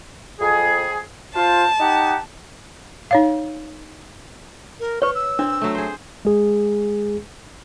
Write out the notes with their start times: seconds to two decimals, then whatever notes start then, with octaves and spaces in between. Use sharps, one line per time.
0.40 F2 G#4
1.35 F4 C5 A5
1.79 D#4 G4 F#5
3.11 D#4 C#5 F5
4.80 A#4
5.02 B4 C#5 C#6
5.15 E6
5.39 C4 D4
5.62 F#3 A3
5.75 G#4 C5
6.25 G#3 G#4